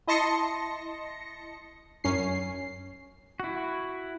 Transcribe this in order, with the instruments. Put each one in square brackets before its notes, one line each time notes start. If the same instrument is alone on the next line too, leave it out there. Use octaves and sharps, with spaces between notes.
[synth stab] E4 D#5 A5 C6 A#6 C#7
F#2 C#4 C7
[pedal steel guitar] E4 F#4